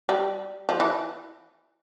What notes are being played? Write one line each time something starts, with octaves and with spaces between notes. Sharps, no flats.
G3
F3
E3